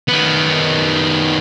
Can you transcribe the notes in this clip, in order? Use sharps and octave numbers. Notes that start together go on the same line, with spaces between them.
D#3 B3